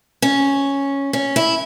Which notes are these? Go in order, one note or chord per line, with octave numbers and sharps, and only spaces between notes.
C#4
C#4
E4